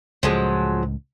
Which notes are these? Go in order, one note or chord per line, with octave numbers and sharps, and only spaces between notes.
C#2 A2 F3 F#3 G#3